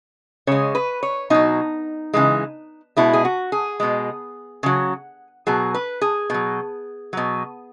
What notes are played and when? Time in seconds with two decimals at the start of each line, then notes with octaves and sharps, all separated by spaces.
0.47 C#3 G#3 C#5
0.75 B4
1.03 C#5
1.30 B2 F#3 D#4
2.14 C#3 E3 G#3
2.97 B2 G#3 E4
3.13 G#4
3.25 F#4
3.52 G#4
3.80 B2 G#3
4.63 C#3 F#3
5.47 B2 F#3 G#4
5.74 B4
6.01 G#4
6.30 B2 F#3
7.13 B2 F#3